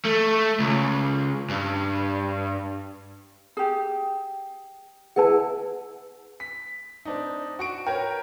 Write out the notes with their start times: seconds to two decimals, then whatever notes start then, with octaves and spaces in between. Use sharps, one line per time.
0.05 A3
0.60 C#2
1.49 G2
3.57 G4 G#4
5.16 E4 G#4 B4 F#5 A5
6.40 B6
7.05 C4 D4 D#4
7.59 F#4 C#6 D7
7.87 A#4 B4 C#5 G5